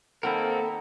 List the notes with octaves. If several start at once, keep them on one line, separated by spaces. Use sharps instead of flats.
D#3 A#3 C4 A4 A#4 F#5 B5